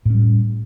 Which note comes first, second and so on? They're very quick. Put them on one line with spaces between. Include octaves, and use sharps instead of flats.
A2 C#4 G3